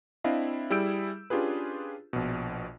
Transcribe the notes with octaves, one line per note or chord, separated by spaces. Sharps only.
C4 D4 E4 D#5 F5
G3 E4 G#4 E6 G6 D7
C#4 D4 F4 G4 G#4 B4
A#1 B2